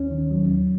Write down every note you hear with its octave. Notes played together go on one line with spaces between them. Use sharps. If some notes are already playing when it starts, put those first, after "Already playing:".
Already playing: D#2 C#4
D#3
F#3
D#2